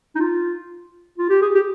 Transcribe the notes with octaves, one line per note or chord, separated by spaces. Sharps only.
D#4
F4
F4
G4
G#4
G4